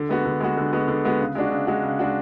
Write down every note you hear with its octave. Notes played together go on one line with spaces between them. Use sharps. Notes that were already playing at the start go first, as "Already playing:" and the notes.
Already playing: D3
G#3 B3 F#4
D3
G#3 B3 F#4
D3
G#3 B3 F#4
D3
G#3 B3 F#4
C#3
G#3 D4 F#4
C#3
G#3 D4 F#4
C#3
G#3 D4 F#4